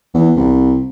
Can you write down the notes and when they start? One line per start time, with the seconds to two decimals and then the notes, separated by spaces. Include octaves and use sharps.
0.14 E2
0.37 C2